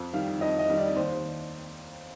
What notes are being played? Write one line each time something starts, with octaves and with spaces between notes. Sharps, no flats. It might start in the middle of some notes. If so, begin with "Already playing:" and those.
Already playing: F2
D#3 G3 F5
F2 D#5
D#5
D#3 G3
D5
D#2 C5